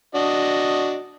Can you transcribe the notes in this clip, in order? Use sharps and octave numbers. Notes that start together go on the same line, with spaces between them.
D4 F#4 D#5